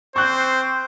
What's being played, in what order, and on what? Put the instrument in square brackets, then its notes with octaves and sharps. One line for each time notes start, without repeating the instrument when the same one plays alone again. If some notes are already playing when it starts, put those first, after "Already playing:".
[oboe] C4 [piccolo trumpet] C5 [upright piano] C#6 F#6 G6